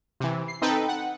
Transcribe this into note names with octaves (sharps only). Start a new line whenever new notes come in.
C3 E3
C7
C4 D#4 A4 B4 G5
F#5